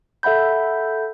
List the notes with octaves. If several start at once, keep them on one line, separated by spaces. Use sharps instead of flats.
A4 E5 F#5 B5 G6